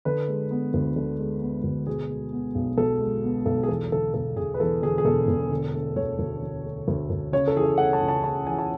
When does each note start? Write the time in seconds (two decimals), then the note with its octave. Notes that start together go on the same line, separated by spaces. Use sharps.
0.05 D3 B4
0.28 G#3
0.51 B3
0.74 D2
0.96 D3
1.19 G#3
1.42 B3
1.64 D2
1.86 B2 G#4
2.09 G#3
2.33 B3
2.55 B1
2.77 B2 A4
3.00 G#3
3.24 B3
3.46 B1 A4
3.63 G#4
3.68 E2 A4
3.92 D3 A4
4.14 E1 A4
4.37 E1 G#4
4.54 B4
4.60 E2 A4
4.82 D3 G#4
4.98 G#4
5.05 E1 A4
5.28 E1
5.51 D3
5.74 A3
5.96 D2 C#5
6.19 D2
6.42 D3
6.65 A3
6.88 D2
7.10 D2
7.32 C#3 C#5
7.47 A4
7.55 E3 G#4
7.63 A4
7.78 A3 F#5
7.93 A5
8.01 C#2
8.08 A5
8.24 C#3 A5
8.47 E3 G#5
8.59 A5